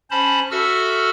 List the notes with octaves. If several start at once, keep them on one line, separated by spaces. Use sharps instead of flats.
C#4 C5 A5 B5
F#4 A4 E5 E6 F6